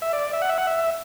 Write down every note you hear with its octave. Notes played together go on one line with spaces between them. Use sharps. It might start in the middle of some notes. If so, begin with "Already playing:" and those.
E5
D5
E5
F#5
E5
F#5
E5